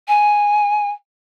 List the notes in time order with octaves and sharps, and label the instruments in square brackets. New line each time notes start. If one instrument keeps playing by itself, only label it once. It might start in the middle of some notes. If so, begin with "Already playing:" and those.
[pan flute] G#5